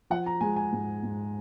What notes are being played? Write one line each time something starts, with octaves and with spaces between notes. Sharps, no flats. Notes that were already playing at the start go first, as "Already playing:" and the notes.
F3 F#5
A#5
G#3 G#5
G#5
G#2
G#2